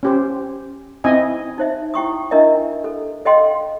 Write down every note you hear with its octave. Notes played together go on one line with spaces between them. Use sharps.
C#4 G4 C5
C4 D#4 E4 D#5 G#5
D#4 C5 E5
E4 G5 C#6 D#6
D4 E4 A#4 D#5 E5
A4
A4 D#5 F5 G5 C6